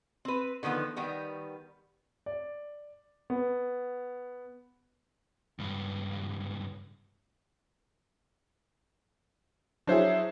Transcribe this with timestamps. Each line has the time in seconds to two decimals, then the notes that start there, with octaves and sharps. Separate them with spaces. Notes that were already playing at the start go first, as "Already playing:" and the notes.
0.25 C4 B4
0.63 D3 D#3 F3 B3
0.96 D#3 G3 B3
2.26 D5
3.30 B3
5.59 C#2 G2
9.87 F#3 D4 E4 G#4 C5 E5